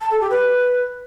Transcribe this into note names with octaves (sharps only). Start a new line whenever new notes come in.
A5
A4
G4
B4